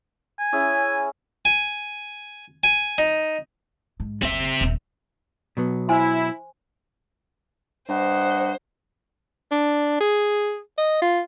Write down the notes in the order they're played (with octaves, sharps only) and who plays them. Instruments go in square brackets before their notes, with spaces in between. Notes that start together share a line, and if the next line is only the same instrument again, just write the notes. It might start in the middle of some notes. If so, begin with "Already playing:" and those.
[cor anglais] G#5
[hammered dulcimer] C#4 E4 G#4
[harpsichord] G#5
G#5
D#4
[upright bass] G#2
[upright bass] F#1 D2 [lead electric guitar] C4 E5
[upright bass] D#1
[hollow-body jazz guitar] B2 F#3 B3
[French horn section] E4 [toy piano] C5 G#5 C6
[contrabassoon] G2 [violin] C5 [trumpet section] D#5 F#5
[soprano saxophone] D4
G#4
D#5
F4